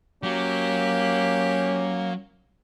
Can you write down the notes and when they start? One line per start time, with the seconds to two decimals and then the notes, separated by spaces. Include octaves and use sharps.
0.23 F#3 A#3 C#4 G4